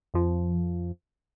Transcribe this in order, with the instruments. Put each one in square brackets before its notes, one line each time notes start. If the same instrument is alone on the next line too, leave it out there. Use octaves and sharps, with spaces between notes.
[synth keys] F2 F3